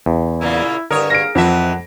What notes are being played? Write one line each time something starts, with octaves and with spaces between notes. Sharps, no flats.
E2
A#2 C#3 A#3 E4
C2 G2 D3 A#4 C#5 D#6
A#3 G#4 F5 A#6 D7
F2 E3 C4 E5 F#5